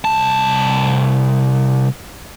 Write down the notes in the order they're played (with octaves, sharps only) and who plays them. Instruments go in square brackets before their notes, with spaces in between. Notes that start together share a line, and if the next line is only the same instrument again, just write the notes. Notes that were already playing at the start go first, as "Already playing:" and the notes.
[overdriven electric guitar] C2 A5